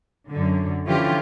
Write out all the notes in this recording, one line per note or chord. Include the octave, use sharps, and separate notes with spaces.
F#2 D3
D3 E3 F3 C#4 F4 G4